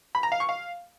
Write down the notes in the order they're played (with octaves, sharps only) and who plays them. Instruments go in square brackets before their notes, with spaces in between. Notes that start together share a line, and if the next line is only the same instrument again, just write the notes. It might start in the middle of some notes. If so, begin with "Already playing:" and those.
[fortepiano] B5
A#5
F5
C#6
F5